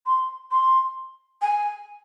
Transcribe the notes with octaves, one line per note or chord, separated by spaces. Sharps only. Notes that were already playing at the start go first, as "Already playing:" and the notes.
C6
C6
G#5